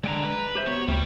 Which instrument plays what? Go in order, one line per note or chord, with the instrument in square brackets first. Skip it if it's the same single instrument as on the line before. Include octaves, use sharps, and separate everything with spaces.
[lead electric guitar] D3 [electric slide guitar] G#3 G5 A#5
[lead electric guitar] B4
[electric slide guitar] G4 C5 E5
[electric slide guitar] B3 F#4 [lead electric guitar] C#5
[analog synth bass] D2 [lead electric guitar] G3